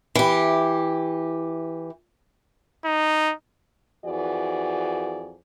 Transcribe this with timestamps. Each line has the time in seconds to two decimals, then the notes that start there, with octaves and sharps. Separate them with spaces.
0.15 E3 G4
2.85 D#4
4.05 F2 E3 F#4 G#4 D5